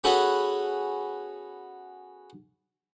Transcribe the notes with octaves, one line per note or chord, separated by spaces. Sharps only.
B3 C#4 F#4 G#4 A4 B4